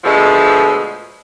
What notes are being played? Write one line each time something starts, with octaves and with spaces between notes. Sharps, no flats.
B2 D3 F3 G#3 A3